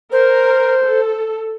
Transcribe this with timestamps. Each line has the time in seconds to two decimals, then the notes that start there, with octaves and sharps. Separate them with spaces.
0.12 A#4 C5
0.84 A4